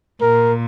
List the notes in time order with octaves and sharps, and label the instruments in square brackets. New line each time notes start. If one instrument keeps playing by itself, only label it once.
[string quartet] A#2 [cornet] A#4